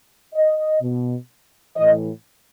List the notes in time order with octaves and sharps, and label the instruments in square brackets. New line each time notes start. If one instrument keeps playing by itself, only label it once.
[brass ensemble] D#5
B2
A2 E3 D#5